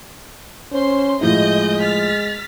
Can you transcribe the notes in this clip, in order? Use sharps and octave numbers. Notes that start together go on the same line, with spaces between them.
C#4 C5 C6
A2 F3 G#3 E4 D#5 G6
F6 A6 B6